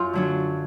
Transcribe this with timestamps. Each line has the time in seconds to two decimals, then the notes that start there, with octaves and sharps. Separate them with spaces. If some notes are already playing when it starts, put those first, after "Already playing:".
Already playing: F#2 F4
0.13 D3 F#3 D4